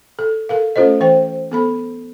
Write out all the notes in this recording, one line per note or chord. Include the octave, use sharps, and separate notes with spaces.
A4
A4 A#4 F5
A3 C#4 F4 A4 C5 D#5
E3 C5 G5
B3 A4 B5